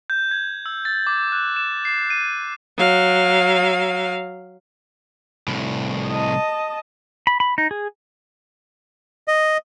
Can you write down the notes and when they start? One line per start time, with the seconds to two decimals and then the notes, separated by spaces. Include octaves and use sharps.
0.10 G6
0.31 G#6
0.66 E6
0.85 A6
1.07 D6
1.32 F#6
1.56 E7
1.85 C7
2.10 D#7
2.77 F#3 F5
5.48 C2 A2
6.08 D#5 A5
7.27 B5
7.40 B5
7.58 D#4
7.71 G#4
9.28 D#5